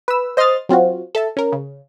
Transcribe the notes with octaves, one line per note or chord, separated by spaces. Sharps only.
B4 E6
C5 D#5 C6 D#6 F6 A6
F#3 C4 F4 F#4
A4 E5 A5
C#4 A#4
C#3